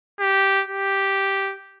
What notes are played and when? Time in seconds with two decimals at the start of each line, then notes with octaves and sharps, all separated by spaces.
0.20 G4
0.68 G4